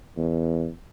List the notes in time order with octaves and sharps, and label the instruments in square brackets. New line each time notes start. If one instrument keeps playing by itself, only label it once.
[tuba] E2